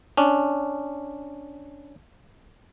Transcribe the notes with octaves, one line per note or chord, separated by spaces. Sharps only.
C#4 D4